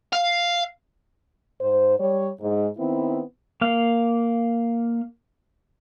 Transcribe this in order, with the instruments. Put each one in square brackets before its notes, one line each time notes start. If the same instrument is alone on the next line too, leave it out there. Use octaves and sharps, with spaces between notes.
[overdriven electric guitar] F5
[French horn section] G#2 C5
G3 C#5
G#2
D#3 B3 C4 E4
[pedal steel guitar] A#3 F5